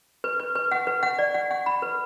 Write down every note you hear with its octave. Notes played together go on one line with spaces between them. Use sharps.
B4
B4
B4
F#5
B4
F#5
D5
F#5
F#5
B5
B4